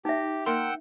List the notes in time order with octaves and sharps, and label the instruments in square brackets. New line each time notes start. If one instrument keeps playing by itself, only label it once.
[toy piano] D#4 E5 [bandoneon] G4
[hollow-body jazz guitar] A#3 A#4 C6 [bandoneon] F#5 G5 E6